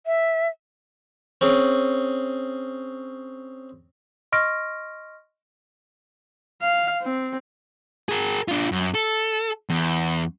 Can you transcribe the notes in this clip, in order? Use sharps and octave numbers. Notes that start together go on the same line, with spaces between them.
E5
C4 C#4 G#4
D#5 C6 C#6 F6 A#6 D7
F5
C4
G#4 A#4
D4 F4
F#2
A4
E2